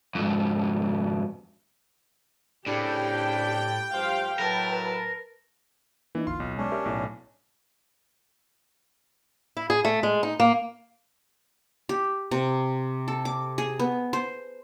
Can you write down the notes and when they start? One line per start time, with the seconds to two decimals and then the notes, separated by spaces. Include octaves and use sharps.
0.15 F2 G#2
2.66 A2 C#3 C4 D4 G4 G5
3.94 G2 F3 G4 C5 F5
4.39 A2 F#3 A#4 B4 A5
6.15 E3 A#3 D4 D#4
6.27 G#1 D2 E4 F4 C6
6.40 B1
6.58 G#3 C#4 D4
6.72 G4 A#4 E5 C6 F6
6.85 B1 A2
9.57 E4
9.70 G#4
9.85 A3
10.03 G#3
10.23 D#4
10.40 A#3
11.89 G4
12.31 C3
13.08 A4
13.25 D6
13.58 G#4
13.79 B3
14.13 C5